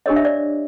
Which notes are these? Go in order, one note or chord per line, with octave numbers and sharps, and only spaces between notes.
D4 G4 A#4 C#5 D#5
E5
D5